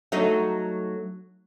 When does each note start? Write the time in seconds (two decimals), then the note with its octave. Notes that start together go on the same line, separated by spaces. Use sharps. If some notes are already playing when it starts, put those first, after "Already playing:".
0.12 F#3 A3 D#4